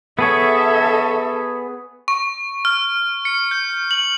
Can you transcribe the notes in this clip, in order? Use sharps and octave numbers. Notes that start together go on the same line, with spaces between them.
B3 G#4 A4 C#5 E5
C#6
F6
C#7
G6
F#7